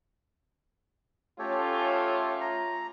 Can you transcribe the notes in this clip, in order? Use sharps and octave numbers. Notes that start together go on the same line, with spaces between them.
A3 C#4 F4 G4 A4 C#5
A#5